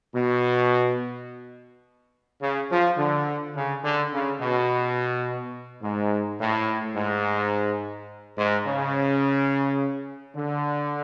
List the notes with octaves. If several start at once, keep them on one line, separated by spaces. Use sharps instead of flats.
B2
C#3
F3
D3
C#3
D3
C#3
B2
G#2
A2
G#2
G#2
C#3
D3